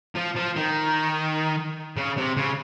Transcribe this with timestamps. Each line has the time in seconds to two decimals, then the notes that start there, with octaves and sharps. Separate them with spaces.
0.15 F3
0.36 F3
0.56 D#3
1.97 C#3
2.18 C3
2.37 C#3